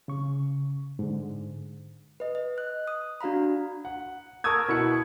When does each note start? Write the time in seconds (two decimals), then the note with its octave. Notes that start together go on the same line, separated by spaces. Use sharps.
0.08 C#3 C#6
0.99 G#2 D3
2.20 B4 D#5
2.35 D#5
2.58 F#6
2.87 D#6
3.21 D4 F#4 F5 A#5 B5
3.85 F#5
4.44 A#4 A5 C#6 D#6 E6 G#6
4.68 B2 E4 F#5 C#7